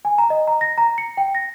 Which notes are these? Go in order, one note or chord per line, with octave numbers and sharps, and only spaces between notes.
G#5
A#5
D#5
A#5
A#6
A#5
C#7
G5
A#6